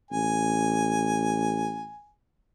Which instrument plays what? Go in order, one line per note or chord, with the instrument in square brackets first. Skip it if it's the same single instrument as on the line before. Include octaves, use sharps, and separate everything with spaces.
[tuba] A1 [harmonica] G#5